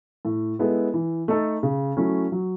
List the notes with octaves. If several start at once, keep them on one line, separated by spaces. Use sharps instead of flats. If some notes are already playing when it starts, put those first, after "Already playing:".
A2
G#3 B3 E4 A4
E3
A3 D#4 A4
C#3
F#3 A3 C#4 E4
F#3